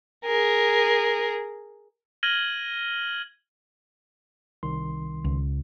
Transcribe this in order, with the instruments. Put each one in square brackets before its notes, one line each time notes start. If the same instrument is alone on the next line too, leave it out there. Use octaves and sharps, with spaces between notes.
[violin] G#4 A#4
[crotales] F6 G#6 A#6 D#7 F#7 G7
[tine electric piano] C2 D#3 C6
[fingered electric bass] C#2